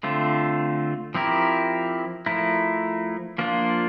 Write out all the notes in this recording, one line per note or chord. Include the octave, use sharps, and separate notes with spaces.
D3 A3 C4 F4
F3 C4 E4 G4 A#4
F3 A3 E4 A#4
F3 A#3 D4 F4